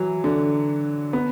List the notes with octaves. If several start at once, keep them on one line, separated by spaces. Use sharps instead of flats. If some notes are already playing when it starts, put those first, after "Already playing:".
Already playing: E3 F#3
D3
B3